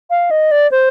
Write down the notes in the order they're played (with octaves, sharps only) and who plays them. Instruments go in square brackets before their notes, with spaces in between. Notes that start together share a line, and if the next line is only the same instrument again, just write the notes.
[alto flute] F5
D#5
D5
C5